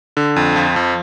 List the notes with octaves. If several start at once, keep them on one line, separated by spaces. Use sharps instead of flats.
D3
F2
F3
F2